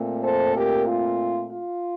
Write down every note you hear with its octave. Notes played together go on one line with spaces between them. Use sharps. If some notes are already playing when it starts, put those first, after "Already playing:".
Already playing: A#2 A3 C4
A4 C5
G4 A#4
F4
F4